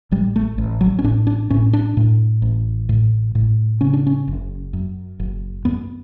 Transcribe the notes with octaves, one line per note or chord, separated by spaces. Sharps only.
A1 G3
A3
A1
F#3
C#4
A2 D4
D4
A2 C#4
D4
A2
A1
A2
A2
C#3 C#4
D4
C#4
F#1
F#2
F#1
F#2 B3